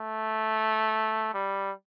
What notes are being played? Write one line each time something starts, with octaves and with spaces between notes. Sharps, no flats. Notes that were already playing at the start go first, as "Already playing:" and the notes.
Already playing: A3
G3